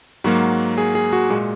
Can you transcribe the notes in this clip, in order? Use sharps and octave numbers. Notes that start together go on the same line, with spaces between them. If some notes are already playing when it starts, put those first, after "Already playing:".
G#2 F#3 A#3 F#4
G#4
G#4
F#4
A#2 G#3 F#4